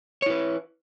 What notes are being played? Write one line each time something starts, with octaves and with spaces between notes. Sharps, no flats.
E4 B4 C#5